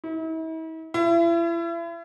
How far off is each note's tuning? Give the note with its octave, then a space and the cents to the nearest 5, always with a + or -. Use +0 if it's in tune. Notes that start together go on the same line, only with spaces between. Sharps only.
E4 -45
E4 +35